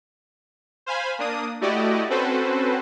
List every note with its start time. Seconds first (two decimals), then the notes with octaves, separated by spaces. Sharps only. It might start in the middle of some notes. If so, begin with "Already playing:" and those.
0.86 C5 F5 G#5 B5
1.19 A#3 D4 D#6
1.61 A3 E4 F#4 G4 D5 D#5
2.10 C4 C#4 F#4 A4 B4 C5